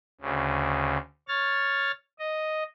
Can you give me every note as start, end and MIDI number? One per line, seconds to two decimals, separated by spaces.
0.21 0.97 38
0.21 0.97 49
1.28 1.91 73
1.28 1.91 89
1.28 1.91 93
2.19 2.63 75